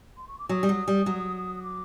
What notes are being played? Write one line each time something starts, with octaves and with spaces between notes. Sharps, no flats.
C6
C#6
D6
F#3 D#6
G3
F#3
G3
F#3
D6